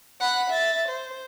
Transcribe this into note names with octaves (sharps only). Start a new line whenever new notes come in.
F#5 B5
E5 A6
C5